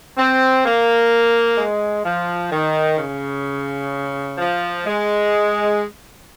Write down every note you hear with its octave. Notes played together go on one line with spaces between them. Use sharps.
C4
A#3
G#3
F3
D#3
C#3
F3
G#3